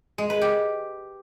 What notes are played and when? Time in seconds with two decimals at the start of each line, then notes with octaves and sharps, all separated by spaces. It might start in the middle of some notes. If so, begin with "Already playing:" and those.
0.18 G#3
0.30 B4
0.41 G4